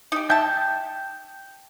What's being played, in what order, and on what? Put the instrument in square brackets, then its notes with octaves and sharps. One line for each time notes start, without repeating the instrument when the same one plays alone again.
[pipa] D#4 G4
[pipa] E5 A5 [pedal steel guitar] G5 G6